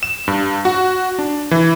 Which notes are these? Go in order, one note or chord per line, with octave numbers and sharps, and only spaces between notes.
E7
G2
F#4
D4
E3